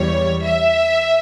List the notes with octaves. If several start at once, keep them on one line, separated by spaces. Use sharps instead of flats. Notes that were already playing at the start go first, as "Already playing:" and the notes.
Already playing: E2 E3 G3 C#5
E5